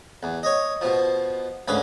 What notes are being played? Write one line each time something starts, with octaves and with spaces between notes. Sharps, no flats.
E2
C#5 D#5
B2 F3
D2 G#2 C#4 B4 F5